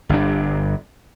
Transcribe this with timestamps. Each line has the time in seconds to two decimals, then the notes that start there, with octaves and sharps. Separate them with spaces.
0.09 G1 G2 C3 D4